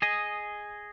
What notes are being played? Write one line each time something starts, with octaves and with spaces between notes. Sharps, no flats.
G#4 D#5